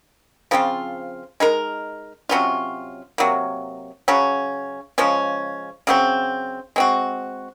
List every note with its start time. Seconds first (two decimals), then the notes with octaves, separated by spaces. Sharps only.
0.51 C#3 F3 C4 F4
1.40 G#3 D#4 A#4
2.29 C3 F#3 C#4 F4
3.18 C3 F#3 A#3
4.08 C#3 F#3 C#4
4.98 C#3 F3 G#3 C#4
5.87 C#3 F#3 C4
6.76 G#3 C4 F#4